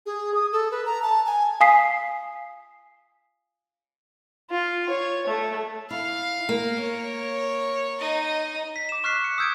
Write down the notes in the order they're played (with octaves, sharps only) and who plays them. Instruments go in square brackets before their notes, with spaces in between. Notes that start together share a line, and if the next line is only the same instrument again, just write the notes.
[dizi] G#4
D#6
A4
B4
A#5
A5
G#5
[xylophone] F5 G#5 D#6 B6 C7
[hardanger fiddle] F4
C#5
A3
[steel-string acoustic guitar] E4 [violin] F5
[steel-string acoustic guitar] A#3 [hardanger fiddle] A#4
[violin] C#5
[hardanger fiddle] D#4 D#5
[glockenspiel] B6
D6 E7
C#6 F6 F#6 B6 C7
C#7
D#6 E6 G6 G#6 D7